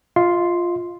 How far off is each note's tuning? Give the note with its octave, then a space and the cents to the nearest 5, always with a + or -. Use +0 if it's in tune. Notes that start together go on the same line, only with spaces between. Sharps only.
F4 +0 D#5 +45 C6 +0